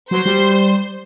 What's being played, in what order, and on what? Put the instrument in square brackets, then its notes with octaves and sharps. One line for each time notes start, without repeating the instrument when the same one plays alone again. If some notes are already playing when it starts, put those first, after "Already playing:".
[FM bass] F#3 [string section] C5
[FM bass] G3